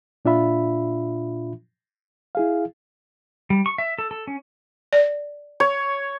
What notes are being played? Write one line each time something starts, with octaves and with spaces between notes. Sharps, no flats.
A#2 D4 F4 E5 B5
E4 G#4 F5
G3
C#6
E5
A4
A4
C#4
D5
C#5